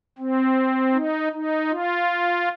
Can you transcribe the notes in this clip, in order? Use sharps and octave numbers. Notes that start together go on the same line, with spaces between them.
C4
D#4
D#4
F4